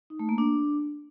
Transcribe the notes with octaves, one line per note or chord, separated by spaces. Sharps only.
D#4
A3
A#3
D4